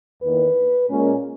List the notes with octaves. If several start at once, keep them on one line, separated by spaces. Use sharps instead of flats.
E2 D#3 A#3 B4
A#2 G#3 C#4